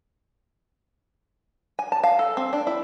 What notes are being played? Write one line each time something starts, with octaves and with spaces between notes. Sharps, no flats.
G#5
A5
F5
A4
C4
D4
E4